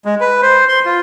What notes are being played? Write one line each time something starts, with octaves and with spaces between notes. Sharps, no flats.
G#3
B4
C5
C6
F4